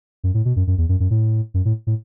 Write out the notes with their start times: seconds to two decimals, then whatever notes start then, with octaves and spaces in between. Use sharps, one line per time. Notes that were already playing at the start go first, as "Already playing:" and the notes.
0.24 F#2
0.34 A2
0.45 B2
0.56 F#2
0.67 F#2
0.78 E2
0.89 F#2
1.00 F#2
1.11 A2
1.54 F#2
1.65 A2
1.87 A2